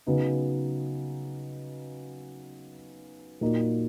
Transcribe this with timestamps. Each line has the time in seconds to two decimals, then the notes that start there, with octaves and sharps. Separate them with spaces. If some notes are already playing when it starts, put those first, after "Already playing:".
0.07 C#3 F#3 B3 D#4
3.41 A#2 F#3 A#3 D#4